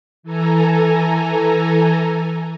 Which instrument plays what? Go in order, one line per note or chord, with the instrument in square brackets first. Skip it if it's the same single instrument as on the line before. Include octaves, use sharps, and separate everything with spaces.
[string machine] E3 A4 G#5 A#5